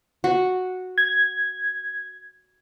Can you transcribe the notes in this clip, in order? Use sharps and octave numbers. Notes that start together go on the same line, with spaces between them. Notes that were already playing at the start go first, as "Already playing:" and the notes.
F#4
G#6